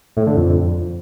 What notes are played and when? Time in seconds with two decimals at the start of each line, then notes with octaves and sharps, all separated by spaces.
0.17 A2
0.27 D3
0.37 F2